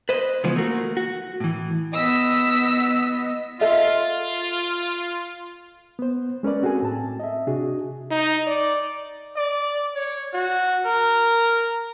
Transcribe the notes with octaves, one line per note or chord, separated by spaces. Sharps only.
B4 C5 D#5
C#3 E3 F3 G#3 B3
A3 A#3 F#4
F#4
A2 E3
B3 D#5 E6 B6
F4 A4 D#5 E5
B3 C5
G#3 C#4 A#4 B4 D5
C4 F#4 G#4 A4 G#5
A2 C4 A5
D#5 E5
C3 D4 F#4 G#4
D#4
D5
D5
C#5
F#4
A#4